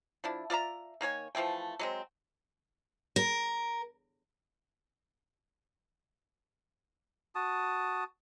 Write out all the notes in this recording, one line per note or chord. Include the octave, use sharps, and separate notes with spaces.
F3 D4 E4
F4 D5 E5 A#5
D#3 A#3 C#5 G#5
E3 F3 A3 G5
F#3 G#3 C4
A#4
F#4 A5 D#6